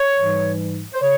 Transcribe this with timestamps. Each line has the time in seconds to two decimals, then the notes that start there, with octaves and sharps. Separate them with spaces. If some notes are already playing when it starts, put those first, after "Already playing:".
Already playing: C#5
0.15 G#2 E3 G3
0.93 C5
1.01 C#3 C#5